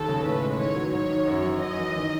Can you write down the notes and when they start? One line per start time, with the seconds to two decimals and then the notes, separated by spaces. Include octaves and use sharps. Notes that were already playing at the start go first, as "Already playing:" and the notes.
Already playing: D#2 A4
0.08 C#3
0.25 A2 B4
0.42 G#3
0.59 D#3 C#5
0.76 F#3
0.93 G#2 C#5
1.10 D#3
1.27 F#2
1.44 E3
1.61 F#2 D#5
1.78 E3
1.96 D#3